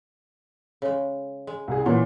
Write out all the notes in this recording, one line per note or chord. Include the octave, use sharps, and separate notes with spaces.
C#3 G#3
G#3
C2 G#4
A#2 E3 F#3